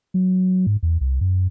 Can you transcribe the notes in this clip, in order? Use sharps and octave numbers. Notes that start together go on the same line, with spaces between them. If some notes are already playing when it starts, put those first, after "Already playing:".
F#3
G#2
E2
C2
F#2